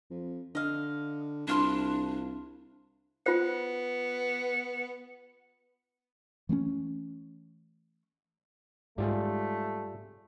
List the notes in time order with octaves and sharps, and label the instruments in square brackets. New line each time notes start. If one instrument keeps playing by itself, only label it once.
[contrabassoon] F2
[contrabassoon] D3 [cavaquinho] D#5 F5
[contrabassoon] C2 [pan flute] D4 [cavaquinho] E4 F4 C6
[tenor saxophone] B3 [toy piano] F4 C5
[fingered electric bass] E3 A3 B3 C#4
[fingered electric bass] G#2 [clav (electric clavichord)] G3 F4 G#4 [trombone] A3